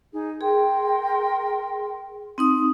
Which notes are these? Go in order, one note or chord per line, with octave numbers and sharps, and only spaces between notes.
D#4 G#4
G#4 A#4 G5 C6
C4 D#4 D#6